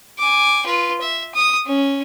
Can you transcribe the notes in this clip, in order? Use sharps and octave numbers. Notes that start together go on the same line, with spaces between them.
G#5 D6
F4 B4
E5
D#6
C#4